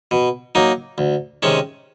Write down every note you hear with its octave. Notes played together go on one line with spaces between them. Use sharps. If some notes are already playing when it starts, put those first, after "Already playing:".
B2
F#3 A#3 D#4
D2
C3 D#3 G#3 C#4